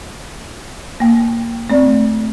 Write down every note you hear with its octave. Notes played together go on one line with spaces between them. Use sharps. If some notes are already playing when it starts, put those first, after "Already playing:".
A#3 G5
A3 C4 D5